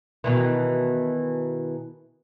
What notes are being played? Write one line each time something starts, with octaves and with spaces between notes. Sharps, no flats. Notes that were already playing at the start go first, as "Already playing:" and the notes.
B2 D#3 E3